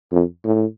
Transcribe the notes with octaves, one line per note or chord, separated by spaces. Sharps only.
F2
A2